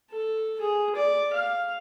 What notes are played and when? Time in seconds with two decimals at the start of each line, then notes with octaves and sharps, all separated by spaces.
0.10 A4
0.60 G#4
0.96 D5
1.33 F5